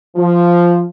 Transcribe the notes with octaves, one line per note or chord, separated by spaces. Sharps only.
F3